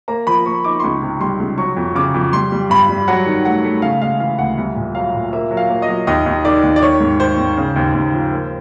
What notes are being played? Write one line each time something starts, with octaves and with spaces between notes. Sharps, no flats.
A#3 A#5
F3 B5
A#3 C#6
D#4 D6
C6
C#2 C#6
C3
G3 C6
C#2
F#3 C#6
F2
C#3 D6
F2
G3 C6
G3
G2 B5
G3
F#3 F#5
D#3
A3 F#5
A3
C#3 F5
G#3 F5
E3 F5
D2 F#5
C2
A#2
F#3 F5
A#2
A#3 E5
F#3
F5
A#3
D#5
F#3
D#2 D#5
D#2
D#3 D5
D#2
D5
D#3 C#5
G#2
D#3 C5
G#2
C#3
D#2
D#2
F3
A#3